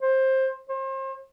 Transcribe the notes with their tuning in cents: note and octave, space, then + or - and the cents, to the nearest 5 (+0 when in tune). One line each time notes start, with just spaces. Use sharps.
C5 +15
C5 +35